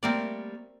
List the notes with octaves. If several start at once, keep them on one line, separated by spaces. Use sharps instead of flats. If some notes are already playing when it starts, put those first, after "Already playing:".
G3 A3 A#3 C4 A#4 D5